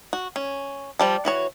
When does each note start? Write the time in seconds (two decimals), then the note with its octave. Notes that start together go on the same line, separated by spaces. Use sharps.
0.13 F#4
0.36 C#4
0.99 F3 G3 A5
1.25 E3 F#4 C#5